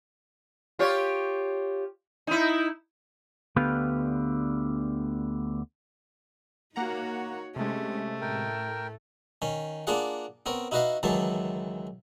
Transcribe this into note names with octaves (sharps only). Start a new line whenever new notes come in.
F4 G4 C#5
D#4 E4
D2 D3 B3 G4 B4 F5
A#3 D#4 F#4 C#5 F#5 A#5
C3 G#3 A3 C#4 G4
A2 A#4 G5
D#3 C#4
A#3 D4 F4 G#4 F#5
B3 C4 A#4 C#5
D#4 E4 F#4 B4 D#5 F5
C#2 D#3 E3 F#3 E4 A5